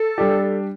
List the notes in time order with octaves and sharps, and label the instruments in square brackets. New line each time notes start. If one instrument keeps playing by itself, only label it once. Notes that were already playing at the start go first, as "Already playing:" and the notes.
Already playing: [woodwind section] A4
[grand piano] G3 D4 G4